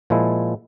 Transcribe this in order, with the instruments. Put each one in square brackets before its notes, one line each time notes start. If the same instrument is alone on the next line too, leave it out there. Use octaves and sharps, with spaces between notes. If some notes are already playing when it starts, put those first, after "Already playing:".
[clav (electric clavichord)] A#2 F3 G#3 E4